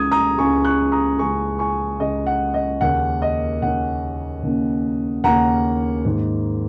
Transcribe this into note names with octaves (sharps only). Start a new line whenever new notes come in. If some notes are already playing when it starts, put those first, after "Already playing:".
Already playing: C#2 C#3 G#3 D#6 G#6
A#5 D#6
C#2 C#3 G#3 G#5 C#6
C#6 F#6
A#5 D#6
C#2 C#3 G#3 G#5 C#6
G#5 C#6
C#2 C#3 G#3 D#5
F#5
D#5
D#2 C#3 A#3 C#4 F#5
D#5
D#2 C#3 A#3 C#4 F#5
D#2 C#3 A#3 C#4
D#2 C#3 A#3 C#4 F#5 A#5
G#2 D#3 A#3